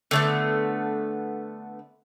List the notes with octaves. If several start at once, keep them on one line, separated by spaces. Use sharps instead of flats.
D3 A3 B3